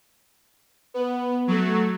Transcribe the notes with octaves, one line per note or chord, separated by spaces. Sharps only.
B3
F#3 A3